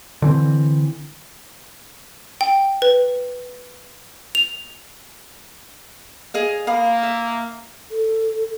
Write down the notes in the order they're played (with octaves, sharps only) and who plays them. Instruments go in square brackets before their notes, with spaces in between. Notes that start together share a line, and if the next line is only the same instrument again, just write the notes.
[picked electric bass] D3 E3 C4
[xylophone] G5
B4
F7
[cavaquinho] G#4 D#5 F5
[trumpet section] A#3 [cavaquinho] F5 B5 D#6
[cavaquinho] E5
[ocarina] A4